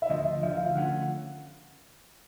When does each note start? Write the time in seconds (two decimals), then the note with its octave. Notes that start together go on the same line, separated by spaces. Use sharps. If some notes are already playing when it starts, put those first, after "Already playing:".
0.02 E5
0.09 D2 D3 F3 D#5
0.43 D2 D3 F3 E5
0.54 F5
0.65 F5
0.75 D3 F3 A3 C#4 F#5